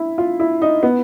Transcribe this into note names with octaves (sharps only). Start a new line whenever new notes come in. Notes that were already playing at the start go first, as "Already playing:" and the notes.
Already playing: E4
F4
E4
D#4
B3